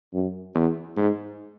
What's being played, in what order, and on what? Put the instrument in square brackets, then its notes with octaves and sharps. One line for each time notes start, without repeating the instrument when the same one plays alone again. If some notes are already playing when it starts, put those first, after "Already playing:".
[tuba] F#2
E2
G#2